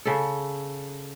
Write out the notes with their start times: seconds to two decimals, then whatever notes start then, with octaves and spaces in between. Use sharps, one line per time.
0.05 C#3 A4